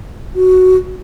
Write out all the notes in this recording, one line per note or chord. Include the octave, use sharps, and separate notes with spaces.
F#4